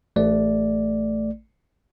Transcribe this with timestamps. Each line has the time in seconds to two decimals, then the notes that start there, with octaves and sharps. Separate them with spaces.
0.16 A1 A3 D5